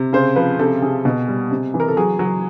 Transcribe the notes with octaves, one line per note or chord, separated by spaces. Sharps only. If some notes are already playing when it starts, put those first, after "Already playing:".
Already playing: C3
C#3 C5
F3 B4
C3 A4
C3 G#4
B2
G3
C3
E3
A#4
A4
F#3 G#4
F#3